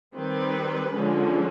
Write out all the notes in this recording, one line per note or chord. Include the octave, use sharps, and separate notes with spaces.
D#3 G3 C4 B4
D3 F3 G#3 C#4